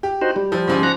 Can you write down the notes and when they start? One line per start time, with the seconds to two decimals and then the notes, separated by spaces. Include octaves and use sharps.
0.03 G4
0.21 D#4 F#4 C5
0.36 G3
0.52 F3
0.68 G#2 C#3 F3
0.83 F#5 A#5